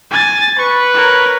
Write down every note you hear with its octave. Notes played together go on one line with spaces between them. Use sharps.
G#5 A6
B4 C#6
A#4 C#5